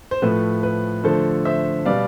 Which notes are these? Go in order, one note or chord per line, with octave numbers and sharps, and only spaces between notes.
C5
A2 F3 A3 B4
B4
D3 F3 A3 A4 C5
C5 E5
B2 G3 B3 D5 F5